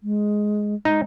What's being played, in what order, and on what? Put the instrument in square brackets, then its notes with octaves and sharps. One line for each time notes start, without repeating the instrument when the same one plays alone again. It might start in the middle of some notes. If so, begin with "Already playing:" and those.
[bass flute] G#3
[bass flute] G#3 [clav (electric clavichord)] D#4